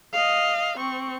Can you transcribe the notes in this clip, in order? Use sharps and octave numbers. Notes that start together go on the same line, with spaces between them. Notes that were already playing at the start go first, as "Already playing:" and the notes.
D#5 F5
C4 C#6